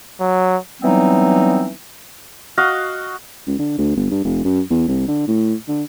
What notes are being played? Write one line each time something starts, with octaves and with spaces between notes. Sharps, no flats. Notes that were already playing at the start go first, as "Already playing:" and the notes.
F#3
E3 F#3 G3 B3 C4 D#4
F#4 D#5 F5
C#2
D3
D2
G1
G2
F1
F#2
E2
C2
D3
A2
D3